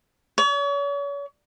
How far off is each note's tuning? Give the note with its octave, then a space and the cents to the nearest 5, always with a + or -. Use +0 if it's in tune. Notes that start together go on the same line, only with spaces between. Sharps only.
C#5 +40